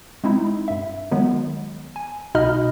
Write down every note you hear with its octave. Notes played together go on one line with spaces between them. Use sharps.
G#3 C4 D#4 E4
G2 E5
D#3 F#3 G#3 B3
G#5
C2 B2 D#4 D#5 B5 F6